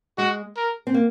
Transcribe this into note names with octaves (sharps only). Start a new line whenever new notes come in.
G#3 F#4
A#4
C4
A#3